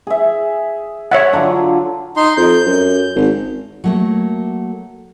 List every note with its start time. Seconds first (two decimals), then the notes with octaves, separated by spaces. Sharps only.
0.07 G#4 E5
1.12 C#5 E5 F#5
1.33 D3 F#3 F4
2.17 D#4 C6
2.37 F2 G6
2.66 F#2
3.15 G#1
3.84 F#3 A3 A#3